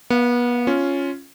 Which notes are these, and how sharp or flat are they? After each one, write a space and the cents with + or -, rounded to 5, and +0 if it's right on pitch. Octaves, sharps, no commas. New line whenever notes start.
B3 -30 F5 +0
C#4 +0 F4 +0